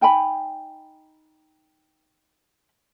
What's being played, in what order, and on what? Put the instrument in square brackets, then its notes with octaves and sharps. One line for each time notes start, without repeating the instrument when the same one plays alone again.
[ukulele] D#4 G5 G#5 B5